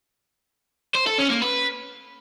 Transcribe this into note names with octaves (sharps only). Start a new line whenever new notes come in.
C5
A4
C#4
A#3
B4